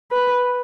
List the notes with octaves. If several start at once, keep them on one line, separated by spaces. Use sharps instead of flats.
B4